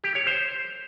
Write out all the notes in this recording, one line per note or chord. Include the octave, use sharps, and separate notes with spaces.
G4
C#5
C5